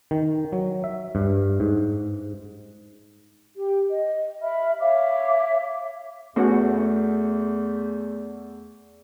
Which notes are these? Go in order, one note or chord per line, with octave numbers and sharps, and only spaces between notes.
D#3
F#3
E5
G2
G#2
G4
D#5
E5 B5 F6
C#5 E5 F5 D6
E2 A3 B3 C#4 F#4